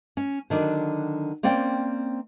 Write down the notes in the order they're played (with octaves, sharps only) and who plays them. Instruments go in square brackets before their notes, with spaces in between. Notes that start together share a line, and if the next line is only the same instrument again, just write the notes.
[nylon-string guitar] C#4
D3 D#3 F#3 D4
A#3 C4 C#4 D5 G5